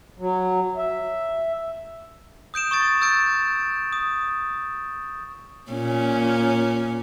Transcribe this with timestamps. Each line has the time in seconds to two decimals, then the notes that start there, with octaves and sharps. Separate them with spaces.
0.18 F#3
0.77 E5
2.54 D#6 G6 D7 E7
2.71 C#6 D#6 A6 D7
3.01 E6 G6 A6 D7
3.93 D#6
5.72 A#2 C#4